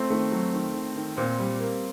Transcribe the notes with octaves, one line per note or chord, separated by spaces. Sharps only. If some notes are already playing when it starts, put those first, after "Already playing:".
Already playing: A3 C4
D#3 A3
F#3
D#3
D#3
D#3
A#2 C4
G3
A#3